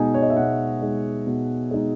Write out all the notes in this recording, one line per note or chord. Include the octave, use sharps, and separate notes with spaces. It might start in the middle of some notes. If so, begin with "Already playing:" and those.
Already playing: B2 G#3 D#4 G#5
C#5
D#5
E5
B2 F#5
G#3 D#4
B2
G#3 D#4